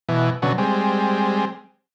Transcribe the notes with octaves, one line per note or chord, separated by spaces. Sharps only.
B2 E3
B2 D3 F#3 C#4
G3 G#3 C4